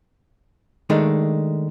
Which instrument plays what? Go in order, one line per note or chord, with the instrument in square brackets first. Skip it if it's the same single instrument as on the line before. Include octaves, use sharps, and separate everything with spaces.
[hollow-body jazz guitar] D#3 G#3 A3 D4